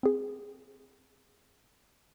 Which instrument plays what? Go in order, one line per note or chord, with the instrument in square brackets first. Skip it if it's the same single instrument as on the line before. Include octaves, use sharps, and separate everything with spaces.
[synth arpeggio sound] C4 G#4